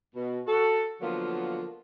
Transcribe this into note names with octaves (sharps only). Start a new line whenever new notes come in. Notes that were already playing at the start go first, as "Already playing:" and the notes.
B2
F#4 A4
D3 F3 F#3 A#3 B3 F4